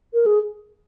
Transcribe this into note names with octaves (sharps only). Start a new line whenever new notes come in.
A#4
G#4